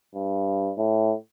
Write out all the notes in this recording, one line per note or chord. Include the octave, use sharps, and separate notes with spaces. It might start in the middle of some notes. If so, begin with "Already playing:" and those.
G2
A2